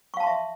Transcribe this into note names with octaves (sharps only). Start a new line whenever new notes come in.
E5 F5 A5 C6 C#6